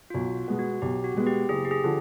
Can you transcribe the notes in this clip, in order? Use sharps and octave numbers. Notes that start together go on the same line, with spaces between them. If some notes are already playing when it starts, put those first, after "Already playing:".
F4
B1 F#4
B2 G#3 B3
F#4
B1 G4
F#4
B2 G#3 B3
G4
F#1 G#4
G4
G#4
D3 F3